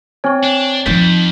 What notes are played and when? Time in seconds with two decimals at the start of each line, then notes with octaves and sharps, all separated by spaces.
0.24 C4 C#5 G#5 C#6
0.43 D4
0.86 F2 F3 D#4 G6 A6 B6